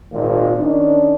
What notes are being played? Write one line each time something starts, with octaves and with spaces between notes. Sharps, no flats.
G#1 A#2
D#3 C#4 D4